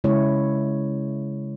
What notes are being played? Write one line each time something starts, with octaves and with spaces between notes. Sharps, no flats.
C#3 G#3 E4 C#5